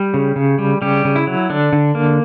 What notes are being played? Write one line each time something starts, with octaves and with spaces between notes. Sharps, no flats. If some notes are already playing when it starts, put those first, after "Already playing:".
Already playing: G3 G4
C#3
C#3
G3
C#3 G3 G4
C#3
E4
F#3
D3 D4
D3
A#3